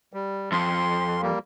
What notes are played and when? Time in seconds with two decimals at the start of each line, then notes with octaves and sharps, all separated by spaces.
0.13 G3
0.52 F2 C6
1.22 G3 A#3